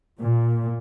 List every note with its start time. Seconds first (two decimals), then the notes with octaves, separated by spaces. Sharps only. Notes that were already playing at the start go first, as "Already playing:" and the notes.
0.19 A#2